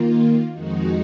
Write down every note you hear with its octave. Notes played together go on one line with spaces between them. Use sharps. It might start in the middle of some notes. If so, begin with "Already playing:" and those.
Already playing: D#3 A#3 F4
F2 D#3 G#3 D#4 F#4